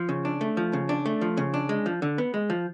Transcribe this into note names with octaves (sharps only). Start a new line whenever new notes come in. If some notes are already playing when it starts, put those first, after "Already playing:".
Already playing: F3
C#3
D4
A3
F3
C#3
D4
A3
F3
C#3
D4
G#3
F3
D3
B3
G#3
F3